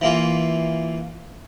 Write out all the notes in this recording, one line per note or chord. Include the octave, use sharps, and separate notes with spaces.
E3 A#3 F4